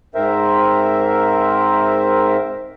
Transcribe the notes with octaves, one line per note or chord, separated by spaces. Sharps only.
G#2 C4 A#4 C5 E5